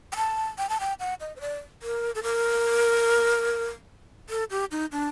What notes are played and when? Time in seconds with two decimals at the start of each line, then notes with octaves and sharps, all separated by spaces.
0.12 G5
0.16 A5
0.58 G5
0.69 A5
0.80 G5
1.00 F#5
1.20 D#5
1.36 C5
1.41 D5
1.83 A#4
2.15 A4
2.23 A#4
4.30 A4
4.50 G4
4.71 D#4
4.92 D4